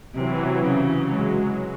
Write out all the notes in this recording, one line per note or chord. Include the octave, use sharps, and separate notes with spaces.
C3 E3 F#3
C#3
F#3 G#3